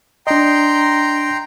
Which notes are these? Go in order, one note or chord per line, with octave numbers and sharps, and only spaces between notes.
D4 D#5 G5 A#5 C6